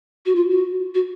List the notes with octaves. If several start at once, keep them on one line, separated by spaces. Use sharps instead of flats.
F#4
F4
F#4
F#4